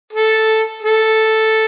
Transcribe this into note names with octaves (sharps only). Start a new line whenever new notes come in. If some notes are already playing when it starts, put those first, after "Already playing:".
A4
A4